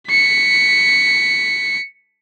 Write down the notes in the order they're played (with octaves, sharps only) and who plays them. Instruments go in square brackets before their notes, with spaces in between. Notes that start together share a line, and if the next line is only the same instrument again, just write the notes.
[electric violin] B6 C#7